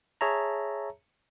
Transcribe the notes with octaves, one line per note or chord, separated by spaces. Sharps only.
G#4 C#5 E5 A5 A#5